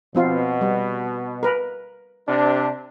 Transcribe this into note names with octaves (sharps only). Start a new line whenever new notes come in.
B2 F3 C4 F4
G3
A#4 B4
C3 D4